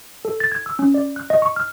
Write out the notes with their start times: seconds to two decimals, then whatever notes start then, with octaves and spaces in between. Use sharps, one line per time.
0.25 A4
0.40 A6
0.52 G#6
0.66 E6
0.79 C#4
0.94 D5
1.16 F#6
1.30 D#5
1.42 C#6
1.56 F6